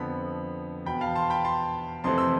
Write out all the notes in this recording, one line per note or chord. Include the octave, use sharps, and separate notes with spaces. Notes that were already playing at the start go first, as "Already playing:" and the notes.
Already playing: F2 D3 F3 B3 B5
E2 B2 B3 G5 B5
F5 A5
A5 C6
G5 B5
A5 C6
F2 C3 E3 A3 C4 A5 C6
C6 E6